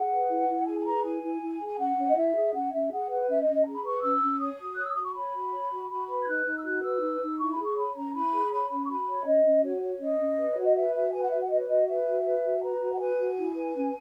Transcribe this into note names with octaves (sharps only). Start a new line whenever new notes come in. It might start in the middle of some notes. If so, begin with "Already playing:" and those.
Already playing: G#4 F#5
B4
E4
E4
G#4 G#5
G#5
B4 A#5
E4 G#5
E4
E4
G#4
G#5
C#4 F#5
C#4 C#5
D#5
E4 E5
G#4
C#4 F#5
C#4 E5
G#4 F#5
B4 F#5
C#4 E5
D#5
C#4
D#5
G#4 A#5
B5
B4 C#6
C#4 E6
C#4
C#5 D#6
F#4
C#5 F#6
E6
F#4 D#6
C#6
C#5 B5
F#4
C#5
F#4
F#4 B5
B4 B5
G#6
D#4 F#6
D#4
E6
F#4 F#6
B4 E6
D#4
D#4
E4 C#6
B5
G#4 C#6
C#5 B5
C#4 A#5
E4 B5
G#4
C#5 B5
C#4 B5
C#6
F#4 B5
C#5
E5
C#4 D#5
C#4
F#4 C#5
C#5
C#4 D#5
C#4
B4
C#5
F#4
D#5
B4 E5
F#4 E5
B4 G#5
F#5
F#4 E5
F#5
B4 D#5
C#5
F#4 D#5
B4 E5
F#4
B4
F#4
B4 A#5
F#4
F#5
B4 G#5
F#4
E4
B4
C#4